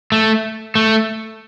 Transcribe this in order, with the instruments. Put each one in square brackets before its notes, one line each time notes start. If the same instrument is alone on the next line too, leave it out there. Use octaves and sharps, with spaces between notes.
[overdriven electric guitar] A3
A3